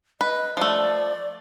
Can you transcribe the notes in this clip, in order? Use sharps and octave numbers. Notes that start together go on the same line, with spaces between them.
B4 D#5
F3 A3 D5